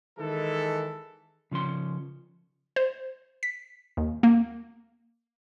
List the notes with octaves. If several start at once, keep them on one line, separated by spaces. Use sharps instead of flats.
D#3 E3 G#3 A4
C#3 F3 C#4 C6
C5
B6
D#2
A#3